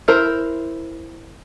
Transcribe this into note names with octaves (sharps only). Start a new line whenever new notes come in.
E4 A#4 C5